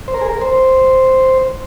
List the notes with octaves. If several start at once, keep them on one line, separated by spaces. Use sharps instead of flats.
C5
A#4
G#4
A#4
C5